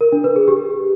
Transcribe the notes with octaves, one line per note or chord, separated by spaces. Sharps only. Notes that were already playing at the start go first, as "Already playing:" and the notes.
A#4
D4
B4
G#4
G4